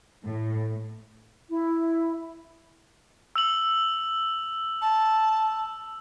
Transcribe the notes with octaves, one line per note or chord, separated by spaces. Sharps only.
A2
E4
E6 F7 F#7
A5